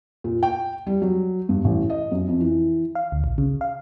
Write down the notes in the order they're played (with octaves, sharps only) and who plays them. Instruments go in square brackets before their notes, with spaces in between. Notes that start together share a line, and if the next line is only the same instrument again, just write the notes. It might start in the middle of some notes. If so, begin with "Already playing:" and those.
[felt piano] A#2
G5
G3
F#3
G2
A1
D#5
F#2
F2
E3
[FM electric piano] F5
D2
A#1
C#3
F5